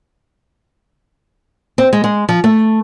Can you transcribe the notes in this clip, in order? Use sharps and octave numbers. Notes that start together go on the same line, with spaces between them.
C4
G#3
G#3
F3
A3